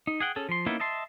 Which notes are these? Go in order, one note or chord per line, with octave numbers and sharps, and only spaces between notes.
D#4
G#4 F#5 G5
C#4 G#4 A4
F3 C6
A#3 B3 C#4 D#4 E4
D#5 E5 A5 C6